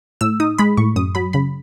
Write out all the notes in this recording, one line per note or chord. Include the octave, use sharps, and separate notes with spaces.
A2 E6
D#4 D#6
G#3 B5
A2 C#6
F#2 D#6
F#3 B5
C#3 B5